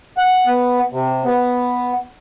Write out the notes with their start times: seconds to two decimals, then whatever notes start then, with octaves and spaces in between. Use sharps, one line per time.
0.17 F#5
0.47 B3
0.92 C3
1.24 B3